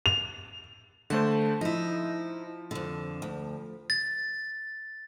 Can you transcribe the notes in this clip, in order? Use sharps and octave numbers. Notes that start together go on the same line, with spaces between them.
F7
D3 A3 C5 A5
F3 D#4 E4
F2 D3
D2
A6